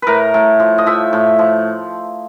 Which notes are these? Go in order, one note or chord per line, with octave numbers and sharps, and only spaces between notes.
A2 A#4 B4
A2
F3
D#5
F3 E5
A2
F3